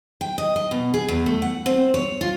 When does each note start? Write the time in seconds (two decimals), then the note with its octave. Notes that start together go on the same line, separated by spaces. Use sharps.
0.21 G5
0.38 D#5
0.56 D#5
0.71 B2
0.94 G#4
1.08 E2
1.26 A3
1.42 F#5
1.66 C4
1.94 C#5
2.21 F4